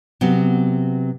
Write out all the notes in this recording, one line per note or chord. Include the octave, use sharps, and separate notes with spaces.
C3 F#3 B3